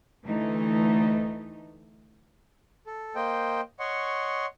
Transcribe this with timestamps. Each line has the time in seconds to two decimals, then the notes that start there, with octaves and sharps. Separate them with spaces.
0.24 D2 E3 A3 D#4
2.87 A4
3.15 A#3 C5 D#5 G5
3.80 C#5 D#5 F#5 C6 C#6